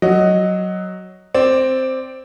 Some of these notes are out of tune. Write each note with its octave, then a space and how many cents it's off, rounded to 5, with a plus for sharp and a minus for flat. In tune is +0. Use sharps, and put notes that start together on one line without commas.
F#3 +5 D#5 +0
C4 +0 D5 +0